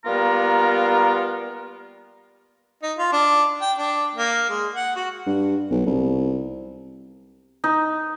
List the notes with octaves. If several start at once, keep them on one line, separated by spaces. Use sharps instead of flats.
G3 A#3 B3 F4 A#4 A#5
D#4
F4
D4
G5
D4
A#3
G#3
F#5
F#4
G2
B1
C2
D#4